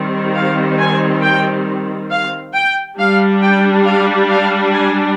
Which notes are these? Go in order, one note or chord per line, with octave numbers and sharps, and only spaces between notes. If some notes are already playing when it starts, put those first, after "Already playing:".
Already playing: D#3 G3 C4
F5
G#5
G5
F5
G5
G3 D4 F5
G5
F5
F5
G#5